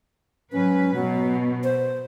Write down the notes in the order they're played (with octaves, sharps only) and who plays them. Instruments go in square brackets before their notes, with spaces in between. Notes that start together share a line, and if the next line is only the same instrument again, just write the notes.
[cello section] G#2 F#3 B4 [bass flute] C#4
[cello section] B2 [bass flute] F#3
[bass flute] C5